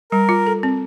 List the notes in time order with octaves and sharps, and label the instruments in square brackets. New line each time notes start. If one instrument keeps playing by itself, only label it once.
[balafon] G3 [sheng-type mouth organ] A#4
[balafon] F4
A4
C4